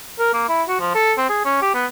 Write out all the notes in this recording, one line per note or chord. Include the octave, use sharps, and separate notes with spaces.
A#4
A#3
E4
F#4
F3
A4
C4
G#4
C#4
G4
B3